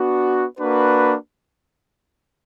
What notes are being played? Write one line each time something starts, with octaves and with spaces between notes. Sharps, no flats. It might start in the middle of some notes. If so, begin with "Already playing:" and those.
Already playing: B3 D4 F#4
A#3 D4 F#4 B4